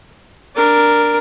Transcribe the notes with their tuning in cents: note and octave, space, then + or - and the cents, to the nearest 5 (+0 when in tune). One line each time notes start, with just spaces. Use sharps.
D4 +0 A#4 +0